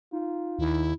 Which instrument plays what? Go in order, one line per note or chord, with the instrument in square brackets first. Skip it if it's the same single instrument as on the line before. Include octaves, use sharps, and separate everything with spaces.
[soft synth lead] D#4 [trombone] F4
[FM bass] D#2 [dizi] E4